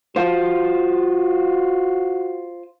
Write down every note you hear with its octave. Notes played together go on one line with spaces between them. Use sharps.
F4 F#4 C5